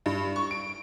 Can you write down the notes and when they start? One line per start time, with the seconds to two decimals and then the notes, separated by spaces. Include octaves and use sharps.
0.06 G2
0.36 C#6
0.51 D7